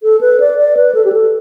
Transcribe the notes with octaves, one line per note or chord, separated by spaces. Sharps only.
A4
B4
D5
D5
B4
A4
G4
A4